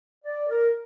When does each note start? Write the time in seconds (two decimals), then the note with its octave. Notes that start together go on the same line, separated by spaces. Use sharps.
0.25 D5
0.49 A#4